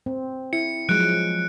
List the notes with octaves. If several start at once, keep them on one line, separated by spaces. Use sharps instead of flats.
C4
E4 C#7
F3 F#3 G#3 F#6 D7